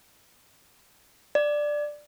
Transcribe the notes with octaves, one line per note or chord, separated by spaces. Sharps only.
D5